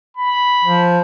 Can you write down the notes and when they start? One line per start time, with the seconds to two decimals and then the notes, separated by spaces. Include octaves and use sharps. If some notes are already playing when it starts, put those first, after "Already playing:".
0.17 B5
0.64 F3